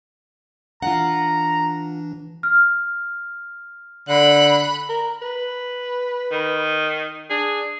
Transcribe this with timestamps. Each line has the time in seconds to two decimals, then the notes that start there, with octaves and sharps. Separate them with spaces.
0.82 E3 D4 F4 F#5 A#5
2.43 F6
4.09 D3 B5 F#6
4.89 A#4
5.22 B4
6.31 D#3
7.30 D4 G#4